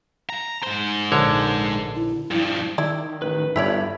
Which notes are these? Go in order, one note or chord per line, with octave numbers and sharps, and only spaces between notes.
A#5
G#2 C5
A#1 D3 C#5
E4
G2 F3
D#3 E4 D5
A1 B4
G1 G2 E4 C#5 D5 B5